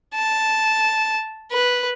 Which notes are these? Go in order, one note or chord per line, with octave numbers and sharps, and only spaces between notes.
A5
B4